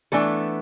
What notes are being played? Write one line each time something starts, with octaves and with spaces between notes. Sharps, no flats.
E3 A3 B3 D4 A4